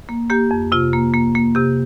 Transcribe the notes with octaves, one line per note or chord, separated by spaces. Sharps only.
A#3
A#3 G4
F2
C3 F4
A#3
A#3
A#3
C3 G4